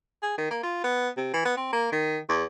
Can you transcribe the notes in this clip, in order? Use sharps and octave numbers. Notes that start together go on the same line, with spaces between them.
G#4
D#3
A#3
F4
B3
C3
E3
B3
C4
A#3
D#3
E2